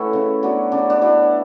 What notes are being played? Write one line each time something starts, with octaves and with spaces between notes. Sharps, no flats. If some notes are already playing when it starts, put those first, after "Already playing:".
Already playing: E3 A3 C#4 E4 F#4
C#3
F#3 B3 D4
C#3 D4
D4
F#3 B3 D4 E4